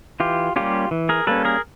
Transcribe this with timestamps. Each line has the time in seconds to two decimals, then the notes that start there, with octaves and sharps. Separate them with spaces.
0.20 E3 F4 G4
0.56 G3 A#3 C#4 F4 G4
0.91 E3
1.09 G#4 A#4
1.27 G3 A#3 C#4 A4 B4
1.45 G#4 A#4